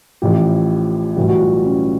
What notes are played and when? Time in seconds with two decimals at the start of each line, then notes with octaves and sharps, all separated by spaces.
0.22 A1 A2 F3 G4
1.17 B1 A2 E3 G3 F#4
1.28 F#4
1.40 F4
1.65 C#4